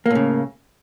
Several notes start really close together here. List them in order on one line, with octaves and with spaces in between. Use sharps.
A#3 A2 C#3